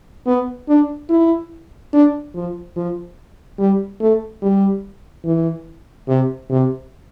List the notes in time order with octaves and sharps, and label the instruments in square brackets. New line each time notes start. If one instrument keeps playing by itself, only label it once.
[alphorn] B3
D4
E4
D4
F3
F3
G3
A3
G3
E3
C3
C3